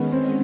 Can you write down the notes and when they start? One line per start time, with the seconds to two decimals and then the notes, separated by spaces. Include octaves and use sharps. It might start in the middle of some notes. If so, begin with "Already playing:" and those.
Already playing: D#3 G#3 B3 C#4
0.12 C4